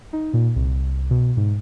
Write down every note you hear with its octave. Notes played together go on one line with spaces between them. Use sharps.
D#4
A#2
C2
B2
G#2